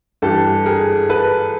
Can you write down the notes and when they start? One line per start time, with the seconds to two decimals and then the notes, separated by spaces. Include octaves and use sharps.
0.22 G2 E3 G4 A4
0.65 G#4 A#4
1.09 A4 B4